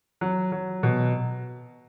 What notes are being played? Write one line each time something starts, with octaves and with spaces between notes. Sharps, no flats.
F#3
F#3
B2